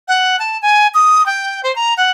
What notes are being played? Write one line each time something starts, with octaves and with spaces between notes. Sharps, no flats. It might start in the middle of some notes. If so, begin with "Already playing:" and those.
F#5
A5
G#5
D#6
G5
C5
A#5
F#5